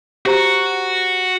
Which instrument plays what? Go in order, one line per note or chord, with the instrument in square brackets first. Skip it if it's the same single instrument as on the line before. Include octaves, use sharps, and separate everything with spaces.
[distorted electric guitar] F#4 [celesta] G4 C5 A#5